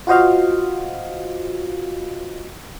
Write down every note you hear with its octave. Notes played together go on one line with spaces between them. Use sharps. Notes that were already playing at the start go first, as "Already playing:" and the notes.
F4 F#4 C5 D#5 F5